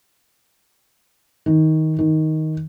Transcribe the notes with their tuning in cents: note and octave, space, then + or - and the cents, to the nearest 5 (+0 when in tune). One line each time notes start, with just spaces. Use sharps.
D#3 +15
D#3 +10